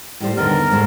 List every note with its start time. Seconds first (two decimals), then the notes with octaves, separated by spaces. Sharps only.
0.20 A2 G3 C5
0.37 D#2 D3 B3 A#4
0.71 G#2 A3 C5